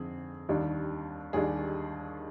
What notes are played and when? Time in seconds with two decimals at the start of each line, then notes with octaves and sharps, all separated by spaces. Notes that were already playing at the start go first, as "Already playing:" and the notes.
Already playing: F2 D3 C4 D#4 G#4
0.49 D#2 D#3 G3 D4
1.33 D#2 D#3 G3 D4 G#4